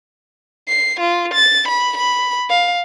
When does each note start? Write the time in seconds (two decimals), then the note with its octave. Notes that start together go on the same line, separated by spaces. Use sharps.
0.68 C7
1.00 F4
1.34 A6
1.68 B5
1.97 B5
2.50 F5